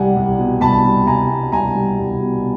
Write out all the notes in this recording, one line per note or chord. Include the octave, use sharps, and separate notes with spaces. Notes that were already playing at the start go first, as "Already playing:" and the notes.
Already playing: C2 G3 F#5 G#5
C2
B2
C2 A5 B5
G3
C2 G#5 A#5
B2
C2 G#5 A#5
G3
C2
B2